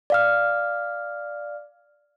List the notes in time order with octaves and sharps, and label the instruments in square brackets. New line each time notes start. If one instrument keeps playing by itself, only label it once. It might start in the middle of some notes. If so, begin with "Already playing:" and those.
[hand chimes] D5 F5 F6